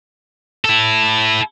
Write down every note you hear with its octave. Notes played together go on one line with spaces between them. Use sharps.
E4 A4